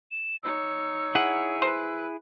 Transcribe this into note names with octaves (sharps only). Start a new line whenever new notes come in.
E7
D#4 C#5 E6
E4 G#4 F#5
B4 C5